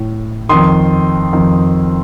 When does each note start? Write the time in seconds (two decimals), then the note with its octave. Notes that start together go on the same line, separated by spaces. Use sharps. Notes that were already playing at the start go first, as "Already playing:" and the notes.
Already playing: A2
0.49 F2 D#3 C6 D#6
1.33 F2 D#3